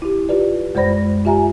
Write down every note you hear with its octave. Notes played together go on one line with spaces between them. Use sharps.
E4 G4
F4 G4 B4 D5
F#2 G#3 C5 D5 B5 A#6
F4 G4 E5 G#5 A#5